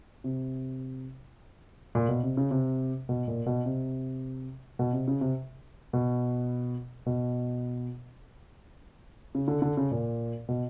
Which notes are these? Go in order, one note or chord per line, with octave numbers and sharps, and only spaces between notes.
C3
A#2
B2
C3
C#3
C3
B2
A#2
B2
C3
B2
C3
C#3
C3
B2
B2
C#3
D3
D3
C#3
A#2
B2